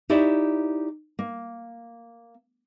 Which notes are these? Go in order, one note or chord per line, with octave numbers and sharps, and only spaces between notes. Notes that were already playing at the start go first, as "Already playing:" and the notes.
D#4 E4 G4 C#5 D5 E5
A#3